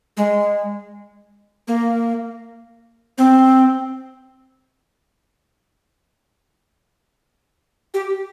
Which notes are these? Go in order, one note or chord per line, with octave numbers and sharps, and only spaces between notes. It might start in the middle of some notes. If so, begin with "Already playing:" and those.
G#3
A#3
C4
G4